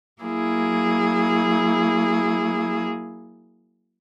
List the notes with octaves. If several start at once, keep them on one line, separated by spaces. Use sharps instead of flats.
F#3 A#3 E4 G#4